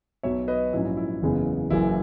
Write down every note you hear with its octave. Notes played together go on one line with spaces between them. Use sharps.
B1 B2 F#3 C#5 E5
B4 D#5
A#1 G#2 F#3 C#4 E4
E4
F#1 E2 C#3 G#3 B3
F#1 F#2 E3 E4